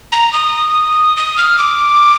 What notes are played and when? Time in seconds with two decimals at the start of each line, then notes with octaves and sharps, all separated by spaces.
0.12 A#5
0.33 D#6
1.17 D#6
1.37 F6
1.58 D6